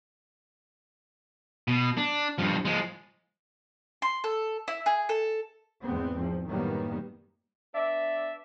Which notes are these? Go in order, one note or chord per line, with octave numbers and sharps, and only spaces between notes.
B2
D4
G2 F3
F3 G#3
C6
A4
E4
G#4
A4
E2 G#2 B3 C4
F3
F#2 A2 D#3 G3 A#3 B3
B3 D4 D5 E5